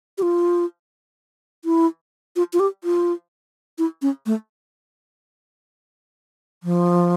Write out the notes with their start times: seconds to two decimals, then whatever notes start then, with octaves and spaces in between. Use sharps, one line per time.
0.18 G4
0.22 F4
1.65 E4
2.36 F4
2.53 F4
2.60 G4
2.84 F4
3.78 E4
4.02 C#4
4.26 A3
6.63 F3